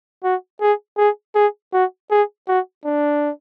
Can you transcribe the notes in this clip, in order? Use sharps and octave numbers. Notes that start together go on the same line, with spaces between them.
F#4
G#4
G#4
G#4
F#4
G#4
F#4
D4